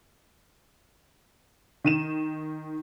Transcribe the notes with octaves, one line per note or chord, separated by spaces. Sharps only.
D#3 D#7 E7